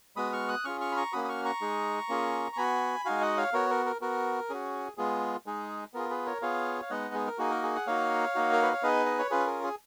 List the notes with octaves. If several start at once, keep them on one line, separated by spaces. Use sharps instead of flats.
G#3 B3 F#4 B5 D#6
C#6 F6
D#6 F#6
C#4 F4 G#4 C#6 F6
C#6 F6
B5
A#5 C#6
A#3 C#4 F#4 B5 D#6
D#6
C#6 F6
A#5 C#6
G#3 D#4 G#4
A#3 C#4 F4 G#4
C#6
B3 F#4 G#5 B5
G#3 D#4 F#4 F5 G#5
D#5 F#5
C#5 F5
B3 F#4 A#4 C#5
A#4
A#4
B3 F#4 A#4
C#4 F#4 G#4
G#3 B3 F4 G#4
G#3 D#4 G#4
B3 F4 G#4 A#4
G#4 B4
A#4 C#5
B3 F4 G#4 C#5 F5
F5
G#3 B3 D#4 D#5 F#5
G#4
A#4
A#3 D#4 F#4 G#4
A#4
G#4
F#5
A#3 D#4 F#4 C#5 F5
A#3 D#4 F#4
A#4
B4
C#5
B3 D#4 G#4 B4 D#5
D#5
C#5
C#4 F4 G#4 B4
A#4
G#4